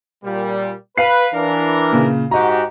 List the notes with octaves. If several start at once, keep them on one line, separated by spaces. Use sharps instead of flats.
A#2 G3
B4 F5 C7
E3 D4 A#4
A#2 C#3
G#2 F#4 G4 D#5 A#5